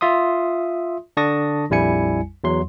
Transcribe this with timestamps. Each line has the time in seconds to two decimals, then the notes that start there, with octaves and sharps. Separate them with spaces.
0.01 F4 E5 C6 D#6
1.17 D3 D4 A5 C#6 D#6 A#6
1.70 A#1 F2 G3 E4 G#5 C#7
2.44 E2 F#3 C6